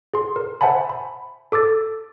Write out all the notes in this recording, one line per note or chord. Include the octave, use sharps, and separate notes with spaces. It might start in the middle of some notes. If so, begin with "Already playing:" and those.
G#4 C6
A#4
C5 E5 F#5 G#5 A5 B5
B5
A4 D6 E6 A6